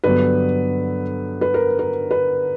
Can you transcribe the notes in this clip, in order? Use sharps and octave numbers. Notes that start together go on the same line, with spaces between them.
G2 D3 F#3 B3 B4
B4
A#4
A#4
B4